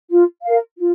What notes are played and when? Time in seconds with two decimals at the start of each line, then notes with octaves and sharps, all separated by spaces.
0.10 F4
0.44 A#4 F5
0.79 F4